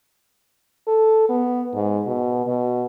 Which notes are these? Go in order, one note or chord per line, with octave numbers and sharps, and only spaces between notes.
A4
B3
G#2
B2
B2